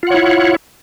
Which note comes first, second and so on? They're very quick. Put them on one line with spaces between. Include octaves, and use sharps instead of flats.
F4 F#5 C#5 E4